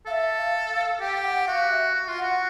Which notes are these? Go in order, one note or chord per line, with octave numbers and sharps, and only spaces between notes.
A4 E5 F5
F5
F5
G4 G5
G5
F#5
F#4 F5
E5
F#4
F4
F#4 F#5